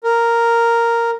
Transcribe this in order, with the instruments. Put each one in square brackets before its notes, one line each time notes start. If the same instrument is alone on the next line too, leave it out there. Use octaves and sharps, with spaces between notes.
[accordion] A#4